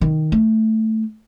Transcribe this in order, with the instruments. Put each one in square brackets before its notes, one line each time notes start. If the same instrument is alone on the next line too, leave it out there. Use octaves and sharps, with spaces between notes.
[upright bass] D#3
A3